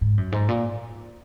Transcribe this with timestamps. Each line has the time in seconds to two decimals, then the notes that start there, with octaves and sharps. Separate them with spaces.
0.01 G#2
0.18 F#2
0.32 G#2
0.48 A#2